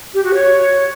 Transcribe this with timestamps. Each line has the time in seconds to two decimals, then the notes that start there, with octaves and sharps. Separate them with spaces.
0.14 G4
0.24 F#4
0.34 C#5